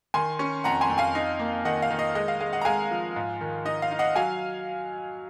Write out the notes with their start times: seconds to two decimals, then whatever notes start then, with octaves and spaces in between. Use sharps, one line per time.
0.14 D#3 G#5 C6
0.39 C#4
0.64 F2 F#5 A#5
0.81 G#5 C6
0.90 F2
0.98 F5 G#5
1.15 D#4
1.39 A#3
1.65 D#3 D#5 F#5
1.82 F5
1.90 D#3
1.99 D#5
2.15 G#3 D#5
2.28 F5
2.41 G#3 F5
2.53 D#5 F#5
2.62 A#5
2.65 G#3 F5 G#5
2.91 F3
3.16 G#2
3.41 D#3
3.65 D#4 D#5
3.82 F5
3.91 D#4
3.99 D#5 F#5
4.16 F#3 F5 G#5